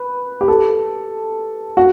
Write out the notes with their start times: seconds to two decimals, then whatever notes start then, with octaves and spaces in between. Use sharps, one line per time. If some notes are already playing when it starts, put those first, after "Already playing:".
Already playing: B4
0.41 G4
0.48 A4
1.77 F#4